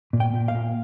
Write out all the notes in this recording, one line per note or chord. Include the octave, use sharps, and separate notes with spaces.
A#2
G5
A#2
F5
A#2